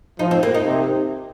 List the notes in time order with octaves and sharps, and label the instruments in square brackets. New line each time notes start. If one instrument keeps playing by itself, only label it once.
[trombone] F3 [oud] D#4
[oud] C4
A#3
D#4
[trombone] C3